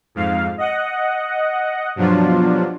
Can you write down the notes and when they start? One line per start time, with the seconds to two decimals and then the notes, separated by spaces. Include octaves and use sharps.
0.15 F2 G#2 F5
0.58 D#5 F#5
1.96 G2 B2 F3 F#3 D4 F4